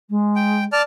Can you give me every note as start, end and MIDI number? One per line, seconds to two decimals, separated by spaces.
0.09 0.65 56
0.36 0.64 79
0.72 0.82 74
0.72 0.82 81
0.72 0.82 89